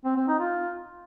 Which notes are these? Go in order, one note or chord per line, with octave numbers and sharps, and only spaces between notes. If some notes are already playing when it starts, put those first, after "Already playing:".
C4
C4
D#4
F4